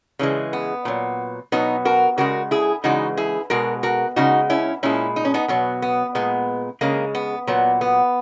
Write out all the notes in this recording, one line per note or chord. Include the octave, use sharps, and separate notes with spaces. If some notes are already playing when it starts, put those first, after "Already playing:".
C#3 E3 G#3
B3
A#2 F#3
B2 F#3 B3 D#4
F#4 A#4
C#3 G#3 F#4 A#4
E4 G#4
C#3 E3 G#3 D#4 F#4
E4 G#4
B2 G#3 F#4 A#4
F#4 A#4
C#3 G#3 D#4 F#4
C#4 E4
A#2 G#3 C#4 E4
D#4
C#4
B3 D#4
B2 F#3 B3
B3
A#2 G#3 B3
C#3 G#3 A#3
B3
A#2 F#3 B3
B3